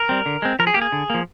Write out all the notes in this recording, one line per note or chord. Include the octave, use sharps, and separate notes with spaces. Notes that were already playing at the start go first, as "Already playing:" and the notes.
Already playing: A#4
G3 C4
D3
G#3 C4
F3 A#4
G#4
A#3 G4
G#4
D3
F3 A#3